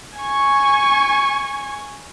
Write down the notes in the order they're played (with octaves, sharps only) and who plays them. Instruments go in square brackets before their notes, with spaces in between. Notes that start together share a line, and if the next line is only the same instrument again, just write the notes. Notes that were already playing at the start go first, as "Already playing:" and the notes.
[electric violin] G#5 C#6